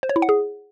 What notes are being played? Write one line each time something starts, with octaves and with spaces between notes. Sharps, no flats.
C5
C#5
E4
F#5
G#4